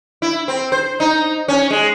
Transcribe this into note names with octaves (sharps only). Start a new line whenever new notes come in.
E4
C4
C5
D#4
C#4
G#3